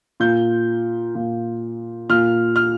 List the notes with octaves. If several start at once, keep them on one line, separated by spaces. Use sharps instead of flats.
A#2 G6
A#2
A#2 F6
F6